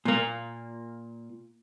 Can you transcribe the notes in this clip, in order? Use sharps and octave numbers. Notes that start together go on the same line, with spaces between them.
A#2 A#3